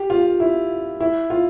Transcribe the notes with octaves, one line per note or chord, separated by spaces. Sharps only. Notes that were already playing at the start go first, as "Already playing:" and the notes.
Already playing: G4
F4
E4
E4
F4